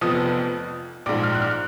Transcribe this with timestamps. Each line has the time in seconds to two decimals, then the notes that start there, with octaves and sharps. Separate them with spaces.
0.01 F1 F2 F3 B3 D#6
1.06 A#1 G#2 F3 D6
1.23 F6
1.35 F#6
1.41 F6